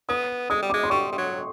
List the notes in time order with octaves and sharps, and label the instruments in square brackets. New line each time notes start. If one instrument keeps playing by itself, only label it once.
[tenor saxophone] B3 [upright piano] D#6
[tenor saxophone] G#3 [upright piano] D#6
[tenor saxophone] G3
[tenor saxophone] G#3 [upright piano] D6
[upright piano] C6
[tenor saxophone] G3 [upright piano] C#6
[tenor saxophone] G3
F#3